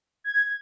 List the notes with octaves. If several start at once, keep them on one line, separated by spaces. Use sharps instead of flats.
G#6